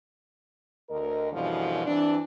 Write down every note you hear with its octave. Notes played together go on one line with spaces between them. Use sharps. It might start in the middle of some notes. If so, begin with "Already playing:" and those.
D2 A#4 D#5
F#2 B2 D3 E3 F3 G3
G2 E3 C4 D4